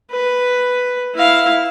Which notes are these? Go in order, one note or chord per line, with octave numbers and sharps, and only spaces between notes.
B4
E4 F5